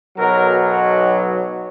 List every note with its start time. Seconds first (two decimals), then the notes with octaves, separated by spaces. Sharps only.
0.16 B1 B2 F#3 A#4